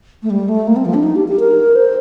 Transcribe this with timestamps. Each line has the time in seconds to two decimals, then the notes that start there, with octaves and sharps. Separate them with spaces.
0.23 A3
0.30 G3
0.49 A3
0.67 A#3
0.76 C4
0.85 F3
0.94 D4
1.03 D#4
1.16 G4
1.28 G4
1.39 A#4
1.75 C5